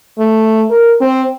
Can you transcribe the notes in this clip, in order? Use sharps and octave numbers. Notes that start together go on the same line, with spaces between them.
A3
A#4
C4